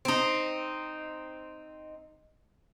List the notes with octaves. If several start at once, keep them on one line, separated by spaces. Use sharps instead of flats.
C4 D#4